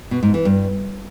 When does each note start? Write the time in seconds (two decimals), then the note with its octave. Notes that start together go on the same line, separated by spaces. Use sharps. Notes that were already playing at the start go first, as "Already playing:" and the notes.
0.11 B2
0.23 G#2
0.34 E3
0.45 G2